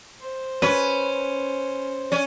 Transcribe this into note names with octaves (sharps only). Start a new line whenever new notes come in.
C5
C#4 B4
C#4 D5